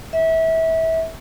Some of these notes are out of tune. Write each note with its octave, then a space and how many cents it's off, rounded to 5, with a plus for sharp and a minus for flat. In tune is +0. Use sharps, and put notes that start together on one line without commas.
E5 -25